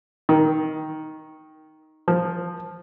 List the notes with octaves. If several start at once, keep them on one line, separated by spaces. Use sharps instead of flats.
D#3
F3